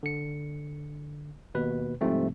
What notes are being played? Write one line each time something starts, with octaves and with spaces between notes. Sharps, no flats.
D3 C#7
D#2 B2 B4
C2 G#2 C3 F3 A3 C4